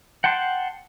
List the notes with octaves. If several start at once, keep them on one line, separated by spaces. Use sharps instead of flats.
F#5 G5 A5 C6